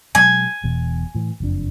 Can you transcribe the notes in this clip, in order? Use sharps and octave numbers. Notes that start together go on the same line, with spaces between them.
B2 F#3 G#3 G#5
E1 E2 B2
A2 E3
F#1 F2 D4